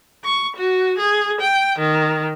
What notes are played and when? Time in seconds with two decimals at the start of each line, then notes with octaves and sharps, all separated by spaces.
0.24 C#6
0.56 F#4
0.98 G#4
1.40 G5
1.78 D#3